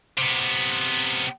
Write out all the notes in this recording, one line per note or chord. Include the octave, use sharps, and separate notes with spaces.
C3 B3